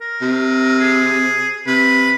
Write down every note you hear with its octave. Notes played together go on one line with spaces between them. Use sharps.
A#4
C3
G#4
C3 B4